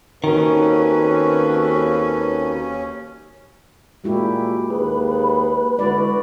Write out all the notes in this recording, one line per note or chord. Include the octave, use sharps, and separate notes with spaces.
D#2 D#3 C4 C#4 F#4 A4 B4
A#2 G#3 E4 F#4 G4
D#2 G#4 B4
D3 G#3 E4 F#4 D5